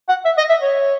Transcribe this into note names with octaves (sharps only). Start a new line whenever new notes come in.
F#5
E5
D#5
E5
C#5